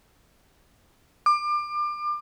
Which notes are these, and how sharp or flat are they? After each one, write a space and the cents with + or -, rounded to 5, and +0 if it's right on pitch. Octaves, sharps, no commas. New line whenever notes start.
D6 +30